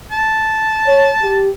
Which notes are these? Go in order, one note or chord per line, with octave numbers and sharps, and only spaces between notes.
A5
C#5
G4